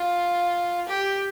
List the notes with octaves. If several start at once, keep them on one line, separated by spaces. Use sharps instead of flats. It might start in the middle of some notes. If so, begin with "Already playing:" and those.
Already playing: F4
G4